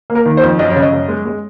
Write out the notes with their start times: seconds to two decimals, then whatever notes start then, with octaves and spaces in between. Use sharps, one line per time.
0.10 A#3
0.15 A#4
0.25 D#3
0.37 C5
0.43 F2
0.59 F#2 D#5
0.70 C#5
0.76 C#3
0.82 D#5
0.92 F#2
1.08 G#3
1.25 G#3